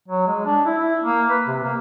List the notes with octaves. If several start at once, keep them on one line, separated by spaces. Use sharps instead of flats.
F#3
G#3
D4
E4
E4
A#3
B4
C3
A#3